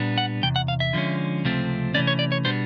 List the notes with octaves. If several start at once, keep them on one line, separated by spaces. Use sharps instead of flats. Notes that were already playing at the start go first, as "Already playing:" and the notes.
Already playing: A#2 G3 B3 D4
F#5
E2 C3 G5
F#5
F5
E5
D3 F3 G#3 C#4
C#2 C3 F3 A3 C4
C3 E3 A3 C#4 D5
C#5
D5
C#5
B2 G3 B3 D4 C5